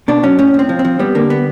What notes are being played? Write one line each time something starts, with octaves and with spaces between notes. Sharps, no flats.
B2 D4
F#3 C#4
A2 C#4
A2 C4
F3
C4
F3
G3 B3
D3 A#3
B3